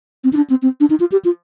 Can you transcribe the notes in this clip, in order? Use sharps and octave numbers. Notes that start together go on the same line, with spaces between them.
C4
D#4
D4
C4
C4
D4
D#4
F4
G4
F4